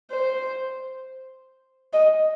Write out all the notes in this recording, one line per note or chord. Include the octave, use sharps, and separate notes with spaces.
C5
D#5